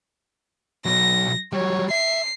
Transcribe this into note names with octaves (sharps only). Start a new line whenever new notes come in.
B1 F#3 A#6
F#3 G3 C#5
E5 C7